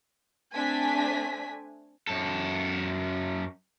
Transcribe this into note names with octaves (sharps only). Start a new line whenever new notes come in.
A3 C4 D4 G#5 B6
F#2 A4